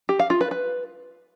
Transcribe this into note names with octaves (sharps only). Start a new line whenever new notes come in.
G4
F5
F4
B4
B4